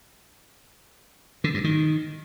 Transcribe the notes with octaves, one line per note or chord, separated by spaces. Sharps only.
D3
G2
D#3